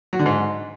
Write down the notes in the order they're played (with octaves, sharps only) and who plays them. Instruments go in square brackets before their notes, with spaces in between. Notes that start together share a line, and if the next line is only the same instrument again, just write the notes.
[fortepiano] F#3
D3
G#2